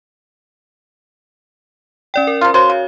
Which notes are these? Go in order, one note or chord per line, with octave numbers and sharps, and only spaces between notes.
C#4 D5 G5
A#4
C3 F4
F#4 C5 C#5 F5
C#3